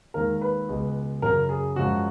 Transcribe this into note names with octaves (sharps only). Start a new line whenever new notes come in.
D#2 D#3 G#3 A#4
B4
C#2 B2 G#3
F#2 C#3 F#3 A#4
G#4
F#2 F3 G#3 F#4